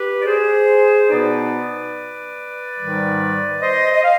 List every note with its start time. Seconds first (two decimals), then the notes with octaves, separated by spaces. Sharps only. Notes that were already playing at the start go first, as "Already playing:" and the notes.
Already playing: G4 B4
0.21 D5
0.26 G#4 C5
1.09 B2 B3 D#4 B4 D5
2.78 G#2 D#3 G3
3.61 C5 D#5
3.94 D#5
4.03 F5